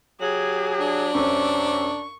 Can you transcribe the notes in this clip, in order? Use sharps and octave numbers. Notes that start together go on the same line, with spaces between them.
F#3 G4 G#4
D4
F#2 C3 C#4 C#6